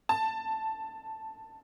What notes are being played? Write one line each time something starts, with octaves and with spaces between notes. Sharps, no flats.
A5